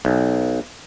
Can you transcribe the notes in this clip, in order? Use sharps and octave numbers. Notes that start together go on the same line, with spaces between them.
B1